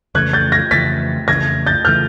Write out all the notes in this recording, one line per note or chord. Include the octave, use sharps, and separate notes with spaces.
F2 C#3 E3 A3 F#6 G#6
G6 A6
G#6 A#6
F2 C#3 E3 A3 A6 B6
F2 C#3 E3 A3 G#6 A#6
G6 A6
C#3 E3 A3 F6 G6